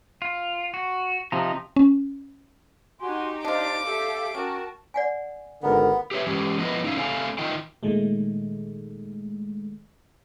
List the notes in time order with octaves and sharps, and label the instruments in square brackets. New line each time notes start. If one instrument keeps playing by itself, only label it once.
[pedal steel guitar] F4
F#4
[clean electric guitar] C3 F3 [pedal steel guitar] D#4 A#5
[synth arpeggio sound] C#4
[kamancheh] D#4 G4 [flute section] F#4 G#5 C6
[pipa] D4 F4 [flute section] C5 D5 D#5 [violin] D6
[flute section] G4 F5 [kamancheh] A4 E5
[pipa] C#4 [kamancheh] F#4 [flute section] A#4 G5 A5
[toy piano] D5 F#5 G#5
[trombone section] G#1 D3 A#4 [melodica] B3
[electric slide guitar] G4 B4 C#5 E5
E3 G#3 C#4 G4
F3 B3 E4 B4 D#5
C#4 D#4 E4 F5
A3 C4 D5 F5 G#5
D#3 D#4 F4 D#5 G5
[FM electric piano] A#2 D#3 G#3 A3